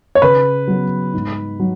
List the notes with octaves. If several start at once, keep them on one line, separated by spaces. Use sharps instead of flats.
C#5
C#3 B4
F#3 B3
G#2
F#3